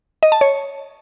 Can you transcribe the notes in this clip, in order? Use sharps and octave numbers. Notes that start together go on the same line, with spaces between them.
D#5
A5
C#5